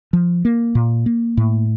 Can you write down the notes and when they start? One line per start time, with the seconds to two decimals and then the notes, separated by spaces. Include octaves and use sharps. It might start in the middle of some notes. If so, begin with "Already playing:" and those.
0.13 F3
0.45 A#3
0.75 A#2
1.06 A#3
1.37 A2